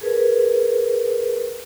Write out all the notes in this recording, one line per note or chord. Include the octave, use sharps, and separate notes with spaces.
G#4 A#4 B4